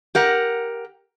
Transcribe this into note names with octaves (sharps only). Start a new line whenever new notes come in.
G4 A#4 F#5